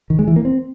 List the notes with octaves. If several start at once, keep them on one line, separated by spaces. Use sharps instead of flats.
D#3
G#3
E3
A#3
C4